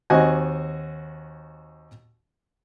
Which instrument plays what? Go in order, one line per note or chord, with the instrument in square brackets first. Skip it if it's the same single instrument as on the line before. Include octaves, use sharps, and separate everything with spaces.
[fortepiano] D#2 C4 F#4 D#5 G#5